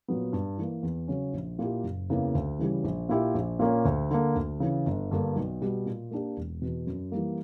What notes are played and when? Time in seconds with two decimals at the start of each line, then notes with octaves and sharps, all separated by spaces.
0.08 A#2 F#3 B3
0.33 G2
0.58 E3 A#3
0.83 E2
1.08 C#3 F#3 C#4
1.34 A#1
1.59 A#2 A#3 E4 G4
1.84 F#1
2.09 E2 C#3 E3 A#3
2.35 D2
2.59 C#3 E3 G3 C#4
2.84 A#1
3.09 A#2 A#3 E4 G4
3.35 A#1
3.59 A#2 A#3 C#4
3.85 D2
4.11 D3 A#3
4.36 D2
4.60 C#3 E3
4.86 G1
5.11 G2 D3 A#3
5.36 B1
5.62 B2 G3 B3
5.86 A#2
6.11 A#3 D4 G4
6.37 E1
6.62 E2 B2
6.87 F#2
7.12 E3 G3 A#3